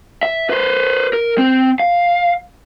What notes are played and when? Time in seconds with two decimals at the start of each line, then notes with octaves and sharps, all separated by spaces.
0.23 E5
0.50 B4 C5
1.13 A#4
1.38 C4
1.80 F5